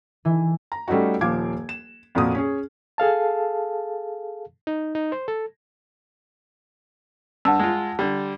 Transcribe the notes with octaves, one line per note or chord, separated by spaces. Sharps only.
E3
A#5
G3 A3 C#4 D#4 F#4
D#1 F3 F5 D6 G#6
E7
F2 A#2 A#3 F#4 D#6
C#4 G#4
G#4 A4 F5 A5
D#4
D#4
C5
A4
G2 F#5 A5 E6
G#3 F4
D3 G3